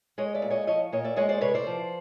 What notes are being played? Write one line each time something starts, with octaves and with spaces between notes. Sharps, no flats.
G#3 C#5 D#5
D5 E5
A#2
C#5 D#5
F3 C#5 D#5
A#2 C#5 D#5
D5 E5
G#3 C#5 D#5
C5 D5
C3 B4 C#5
C5 D5
F3